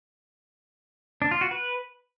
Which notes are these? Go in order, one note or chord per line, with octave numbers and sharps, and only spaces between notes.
D4
F4
F#4
B4